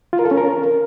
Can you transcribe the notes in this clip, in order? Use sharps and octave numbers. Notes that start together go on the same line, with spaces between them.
F4
A#4
A4
C#4
A#4